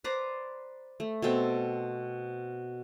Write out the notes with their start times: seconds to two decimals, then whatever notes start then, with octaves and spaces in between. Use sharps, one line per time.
0.04 B4 C5 D5 A#5
1.00 A3
1.22 B2 C4 A4 G5